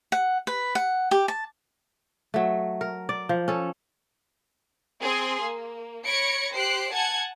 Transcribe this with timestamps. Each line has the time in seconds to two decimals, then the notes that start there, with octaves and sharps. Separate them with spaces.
0.12 F#5
0.47 B4
0.75 F#5
1.11 G4
1.28 A5
2.34 F#3 A3
2.81 A#4
3.09 D5
3.29 F3
3.48 C#4 A4
5.00 C4 G#4 G#5 C6
5.42 A#3
6.05 C#5 B5 G#6 A#6 C#7 D7
6.54 G4 C5 F#6 C7 D7
6.92 F#5 G#5 A5 G#6 C#7